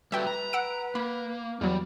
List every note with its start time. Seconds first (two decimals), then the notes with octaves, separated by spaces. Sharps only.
0.12 G3 F#4 A4 B4 E5 G5
0.27 A#5
0.53 F#5 E6 D7
0.95 A#3 B5
1.61 E2 F#3 G3